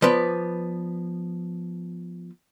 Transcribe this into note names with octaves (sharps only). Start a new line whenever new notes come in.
F3 B3 B4 D5